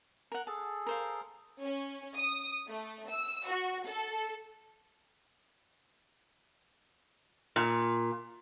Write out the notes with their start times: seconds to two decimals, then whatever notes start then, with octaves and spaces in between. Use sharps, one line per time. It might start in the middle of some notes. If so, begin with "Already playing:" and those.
0.32 A#4 F#5
0.47 G#4 A4 A5
0.86 A#4 C5 F5
1.62 C#4
2.18 D#6
2.68 A3
3.09 E6
3.47 F#4
3.87 A4
7.56 A#2